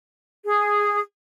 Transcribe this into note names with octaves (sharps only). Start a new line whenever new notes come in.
G#4